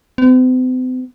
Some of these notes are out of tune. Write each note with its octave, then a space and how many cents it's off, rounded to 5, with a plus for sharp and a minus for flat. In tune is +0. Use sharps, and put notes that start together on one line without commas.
C4 -45